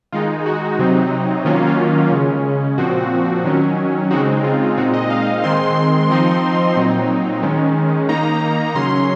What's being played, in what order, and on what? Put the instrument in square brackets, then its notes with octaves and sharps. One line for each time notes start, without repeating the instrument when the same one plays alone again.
[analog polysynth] D#3 G#3 D#4 F4
F#4
C3 F#3 C4 D#4
D#3 F#3 A#3 C#4 F4
F4
C#3 G#3 C#4
A#2 F3 C4 F#4
D#3 F#3 C#4
C#3 G#3 C4 D#4 F#4
F4
A#2 G#3 C4 D#4 F#4
D#5
F5
D#3 G#3 C4 C6
F3 C4 D#4 C6
A#2 F#3 C4 D#4
D#3 G#3 C#4
D#3 A#3 D#4 A#5
C#3 F#3 C#4 C6